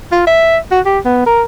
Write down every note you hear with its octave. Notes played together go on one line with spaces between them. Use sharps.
F4
E5
F#4
G4
B3
A#4